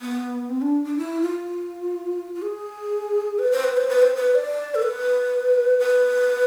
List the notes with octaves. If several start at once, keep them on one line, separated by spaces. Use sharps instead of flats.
B3
C4
D4
D4
E4
F4
F4
G#4
B4
C5
B4
C5
B4
C5
B4
D5
A4
B4
B4